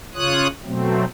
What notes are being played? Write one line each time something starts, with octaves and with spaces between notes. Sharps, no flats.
C#3 F4 C#5 D#6 F#6
B2 F#3 A3 C4